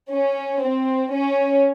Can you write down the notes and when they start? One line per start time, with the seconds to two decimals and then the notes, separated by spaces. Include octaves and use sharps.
0.12 C#4
0.62 C4
1.13 C#4